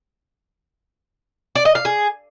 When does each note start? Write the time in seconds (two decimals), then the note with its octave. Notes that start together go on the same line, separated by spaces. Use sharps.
1.55 D5
1.65 D#5
1.75 F5
1.85 G#4